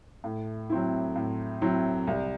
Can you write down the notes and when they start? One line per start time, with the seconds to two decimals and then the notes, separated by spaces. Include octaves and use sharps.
0.24 A2
0.70 F#3 C4 E4
1.16 A2
1.62 F#3 C4 E4
2.07 C2